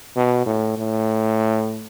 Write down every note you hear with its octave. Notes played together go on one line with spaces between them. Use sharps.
B2
A2
A2